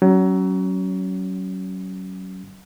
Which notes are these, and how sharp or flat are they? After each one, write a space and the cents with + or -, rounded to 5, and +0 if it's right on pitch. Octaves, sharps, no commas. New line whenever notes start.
F#3 +25 C#4 +0